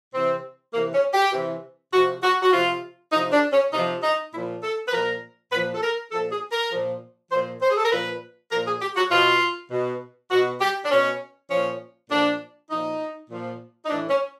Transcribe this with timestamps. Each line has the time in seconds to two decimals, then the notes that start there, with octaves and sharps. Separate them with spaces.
0.14 C3 E3 C4
0.74 C3 E3 A#3
0.94 C#4
1.14 G4
1.33 C3 E3
1.93 C3 F3 F#4
2.23 F#4
2.43 F#4
2.53 C3 F3 F4
3.13 C3 F3 D#4
3.33 D4
3.53 C#4
3.73 C3 F3 D#4
4.03 D#4
4.32 A#2 F3 E4
4.63 A4
4.88 B4
4.93 A#2 F3 A#4
5.52 A#2 B4
5.56 F3
5.74 A4
5.83 A#4
6.12 F3 A4
6.15 A#2
6.32 G#4
6.52 A#4
6.72 A#2 F3
7.31 F3 C5
7.36 A#2
7.62 C5
7.70 G#4
7.77 A4
7.85 A#4
7.91 A#2 F3 B4
8.52 A#2 F3 A#4
8.67 G#4
8.82 G4
8.96 F#4
9.11 B2 F4
9.71 B2
10.31 B2 F#4
10.61 G4
10.85 D4
10.90 B2 C#4
11.51 A#2 F3 C#4
12.11 A#2 F3 D4
12.70 A#2 F3 D#4
13.30 A#2 F3
13.86 D#4
13.90 A2 E3 D4
14.10 C#4